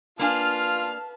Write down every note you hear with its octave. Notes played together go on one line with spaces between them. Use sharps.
A#3 D4 F4 B4 F5 G#5 A5 F6